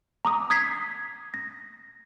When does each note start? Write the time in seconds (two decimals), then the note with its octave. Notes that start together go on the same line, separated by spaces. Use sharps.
0.25 A#5 D6 D#6
0.50 D#6 G#6 B6 C7
1.34 A#6